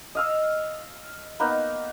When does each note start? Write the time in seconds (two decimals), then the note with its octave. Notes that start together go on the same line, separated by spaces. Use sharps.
0.15 D#5 F5 E6
1.40 A#3 B3 D#4